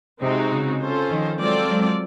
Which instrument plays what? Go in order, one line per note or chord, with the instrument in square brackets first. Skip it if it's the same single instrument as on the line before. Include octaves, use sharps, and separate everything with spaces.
[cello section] C3 [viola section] G#3 C4 D#4 F#4
[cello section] C#3
[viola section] C#4 F4 A4 C5
[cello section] D#3 F3
[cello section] F#3 G#3 [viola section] C4 F4 A4 D5
[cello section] F#3 G#3